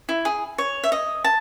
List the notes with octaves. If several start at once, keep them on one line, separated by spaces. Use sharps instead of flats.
E4
G#4
C#5
E5
D#5
A5